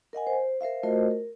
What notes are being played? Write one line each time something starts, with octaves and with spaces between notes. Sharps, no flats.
A#4 D#5 F#5 G#5
C5
A#4 C5 E5 F5
A3 F4 F#4 A#4 C5 D#5
A#4